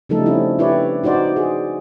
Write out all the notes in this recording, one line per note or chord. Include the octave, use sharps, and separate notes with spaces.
C#3 F3 G3 A3 D#4 A4
C4 C#4 E4
D4 E4 G4 B4 C#5 D5
D#4 F#4 C5 D5
G#4